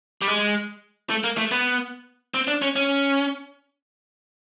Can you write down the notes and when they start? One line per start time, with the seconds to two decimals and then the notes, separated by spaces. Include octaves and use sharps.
0.22 G3
0.28 G#3
1.10 A3
1.24 A#3
1.37 A3
1.51 B3
2.34 C4
2.47 D4
2.62 C#4
2.76 C#4